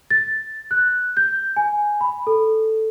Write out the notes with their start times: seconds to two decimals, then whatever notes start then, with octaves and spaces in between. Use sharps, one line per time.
0.10 A6
0.71 F#6
1.17 G6
1.56 G#5
2.01 B5
2.27 A4